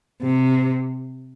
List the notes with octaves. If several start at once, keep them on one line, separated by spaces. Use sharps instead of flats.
C3